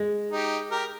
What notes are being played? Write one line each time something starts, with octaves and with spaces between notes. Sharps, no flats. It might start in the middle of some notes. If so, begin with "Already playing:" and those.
Already playing: G#3
D#4 G4
G4 A#4